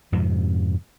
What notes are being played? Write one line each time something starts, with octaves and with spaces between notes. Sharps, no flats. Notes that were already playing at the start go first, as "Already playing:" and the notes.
F2 G#2 C3 F3